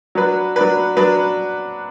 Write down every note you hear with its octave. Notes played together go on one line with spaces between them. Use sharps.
F#3 D4 B4
F#3 D4 B4
F#3 D4 B4